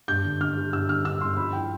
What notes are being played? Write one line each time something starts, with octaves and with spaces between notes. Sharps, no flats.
G2 G6
D3
D3 F6
G3
G2 E6
D3 F6
D3 E6
G2 C6
F3 B5
E4 G5